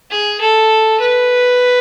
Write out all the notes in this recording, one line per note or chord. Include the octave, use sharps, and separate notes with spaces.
G#4
A4
B4